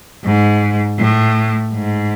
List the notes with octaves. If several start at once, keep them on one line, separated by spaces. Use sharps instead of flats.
G#2
A2
G#2